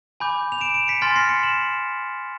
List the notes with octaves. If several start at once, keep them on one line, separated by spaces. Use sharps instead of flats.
G#5 B5 D6 G6
F7
D7 E7
D7 E7
B6 C#7
G#5 C6 F6 A6 B6
A#6 C7
B6 C#7
E7 F#7